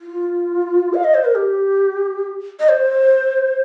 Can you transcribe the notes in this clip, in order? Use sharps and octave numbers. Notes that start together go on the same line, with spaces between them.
F4
F5
D#5
C5
A#4
G4
D#5
C5